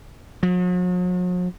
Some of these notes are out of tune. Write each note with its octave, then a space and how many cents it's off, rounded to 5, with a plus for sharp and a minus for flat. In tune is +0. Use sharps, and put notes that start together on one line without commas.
F#3 -45